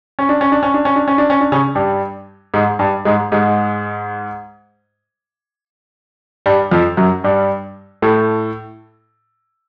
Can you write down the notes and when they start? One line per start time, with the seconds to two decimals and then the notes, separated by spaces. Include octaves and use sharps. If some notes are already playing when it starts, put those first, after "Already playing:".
0.19 C#4
0.29 D4
0.41 C#4
0.52 D4
0.63 C#4
0.74 D4
0.85 C#4
0.96 D4
1.08 C#4
1.18 D4
1.30 C#4
1.41 D4
1.52 C#3 C#4
1.75 G2 G3
2.54 G#2 G#3
2.79 G2 G3
3.05 G#2 G#3
3.32 G#2 G#3
6.46 G2 G3
6.71 F2 F3
6.97 F#2 F#3
7.24 G2 G3
8.02 A2 A3